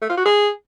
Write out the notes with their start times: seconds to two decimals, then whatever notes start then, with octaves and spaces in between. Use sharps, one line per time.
0.01 A3
0.09 F4
0.17 F#4
0.25 G#4